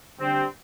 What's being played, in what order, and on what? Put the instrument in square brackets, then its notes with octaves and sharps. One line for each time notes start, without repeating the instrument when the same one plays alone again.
[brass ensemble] D3 G3 D4 G4 [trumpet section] C4